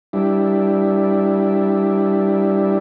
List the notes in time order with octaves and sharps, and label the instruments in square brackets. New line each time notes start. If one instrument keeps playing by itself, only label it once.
[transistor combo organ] G3 D4 E4